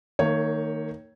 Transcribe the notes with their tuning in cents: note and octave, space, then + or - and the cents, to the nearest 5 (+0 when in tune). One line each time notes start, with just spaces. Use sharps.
D#3 +0 A#3 -35 C#5 +0